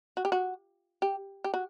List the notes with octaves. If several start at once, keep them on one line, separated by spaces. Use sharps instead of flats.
F#4
G4
F#4
G4
G4
F#4